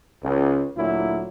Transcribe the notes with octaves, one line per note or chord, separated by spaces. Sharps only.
C#2
D2 A#2 F#3 E4